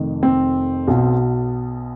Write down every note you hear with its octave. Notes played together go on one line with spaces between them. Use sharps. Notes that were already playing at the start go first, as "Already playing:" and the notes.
Already playing: F1 F2 D#3
C4
B1 B2